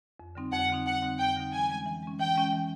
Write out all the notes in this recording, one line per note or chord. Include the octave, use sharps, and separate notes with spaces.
F2
D3 G3 C4 D#4
F2 F#5
D3 G3 C4 D#4
F2 F#5
D3 G3 C4 D#4
F2 G5
D3 G3 C4 D#4
E3 G#5
G#3 C#4
E3
G#3 C#4
E3 G5
G#3 C#4
E3